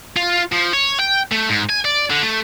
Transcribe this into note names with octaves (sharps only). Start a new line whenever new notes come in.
F4
F3
C#5
G5
A3
G#2
G#5
D5
D3
A3